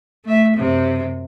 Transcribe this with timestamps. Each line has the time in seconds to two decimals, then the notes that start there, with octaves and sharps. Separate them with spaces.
0.25 A3 E5
0.56 F#2 C3